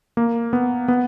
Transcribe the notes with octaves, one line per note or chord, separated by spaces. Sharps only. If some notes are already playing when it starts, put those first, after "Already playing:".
A#3
B3
B3